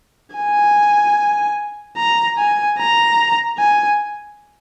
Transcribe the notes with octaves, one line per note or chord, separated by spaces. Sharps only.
G#5
A#5
G#5
A#5
G#5